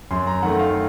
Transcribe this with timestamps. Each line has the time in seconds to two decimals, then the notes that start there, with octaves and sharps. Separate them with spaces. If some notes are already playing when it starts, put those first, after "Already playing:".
0.11 F#2 C6
0.27 A#5
0.43 D#3 A3 F#5
0.59 F5